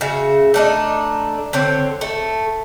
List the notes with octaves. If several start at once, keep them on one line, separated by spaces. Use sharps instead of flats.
C#3 F#4 E5
A3 D4 D#4
D3 C4 C#5
A3